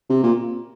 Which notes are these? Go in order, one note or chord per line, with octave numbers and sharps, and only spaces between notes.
C3
A#2